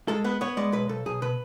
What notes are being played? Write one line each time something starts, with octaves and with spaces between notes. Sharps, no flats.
G#3 A4
B3 B4
B3 C#5
G#3 D5
B1 B4
B1 A4
B1 G#4
B2 B4